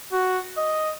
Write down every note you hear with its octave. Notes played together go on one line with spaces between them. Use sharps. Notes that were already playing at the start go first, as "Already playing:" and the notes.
F#4
D#5